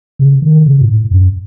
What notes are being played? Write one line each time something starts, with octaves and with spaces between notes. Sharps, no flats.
C#3
D#3
C#3
G#2
A2
F#2